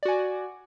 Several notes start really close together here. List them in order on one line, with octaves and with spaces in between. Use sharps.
D5 F#4 G#5